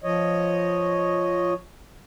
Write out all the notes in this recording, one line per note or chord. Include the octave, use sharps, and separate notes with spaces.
F3 C#5 D#5